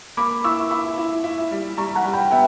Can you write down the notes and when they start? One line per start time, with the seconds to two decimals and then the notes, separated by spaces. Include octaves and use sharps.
0.17 A#3 B5 D6
0.44 E4 C#6 E6
0.71 E4 B5 D6
0.98 E4
1.24 E4
1.51 G3
1.77 G3 A#5 C#6
1.95 F#5 A#5
2.05 G3
2.13 G5 B5
2.31 B3 E5 G5